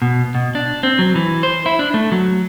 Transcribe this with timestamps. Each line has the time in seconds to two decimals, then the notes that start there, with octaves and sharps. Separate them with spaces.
0.02 B2
0.35 B2
0.55 D4
0.83 C4
0.99 F#3
1.15 E3
1.43 C5
1.66 E4
1.79 D4
1.94 A3
2.12 F#3